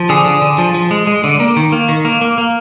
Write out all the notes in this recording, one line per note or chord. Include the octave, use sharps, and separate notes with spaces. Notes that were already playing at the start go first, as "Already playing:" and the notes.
Already playing: F3
D3 G#4
D3
D3
F3
F3
G#3
G#3
D3
A#3
D#3
A#3
D#3
A#3
A#3
A#3